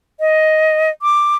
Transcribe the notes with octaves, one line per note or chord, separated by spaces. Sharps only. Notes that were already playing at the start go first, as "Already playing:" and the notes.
D#5
D6